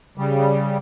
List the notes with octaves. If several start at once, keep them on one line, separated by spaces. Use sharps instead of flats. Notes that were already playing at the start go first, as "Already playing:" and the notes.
C#3 G3